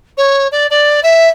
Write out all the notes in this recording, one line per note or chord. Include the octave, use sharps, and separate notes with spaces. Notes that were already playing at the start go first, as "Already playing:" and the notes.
C#5
D5
D5
E5